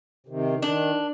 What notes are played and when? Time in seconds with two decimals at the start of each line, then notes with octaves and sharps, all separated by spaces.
0.27 C3 D#3
0.62 D#3 D4